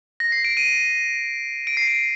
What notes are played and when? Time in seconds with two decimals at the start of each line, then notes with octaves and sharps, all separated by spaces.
0.20 A#6
0.32 C7
0.44 D7
0.57 D#7
1.67 D7
1.77 C7
1.87 D7